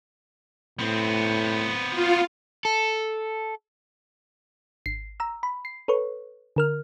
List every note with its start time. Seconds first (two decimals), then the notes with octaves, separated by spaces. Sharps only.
0.79 A2 B3 C4
1.91 F4
2.65 A4
4.86 G#1 C7
5.20 A#5 E6
5.43 B5
5.65 C7
5.88 A4 B4 C#5 C#6
6.56 D3 A#4 F6